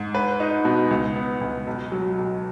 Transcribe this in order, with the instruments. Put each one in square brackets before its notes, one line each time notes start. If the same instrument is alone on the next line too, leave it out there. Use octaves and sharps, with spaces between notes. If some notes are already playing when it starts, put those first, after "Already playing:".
Already playing: [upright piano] G#2
B4
D#4
B2
C#2
B3
C#2
B1
F#3
B1